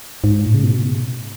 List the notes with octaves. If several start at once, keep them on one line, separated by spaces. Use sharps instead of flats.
G#2
A2
C#3
B2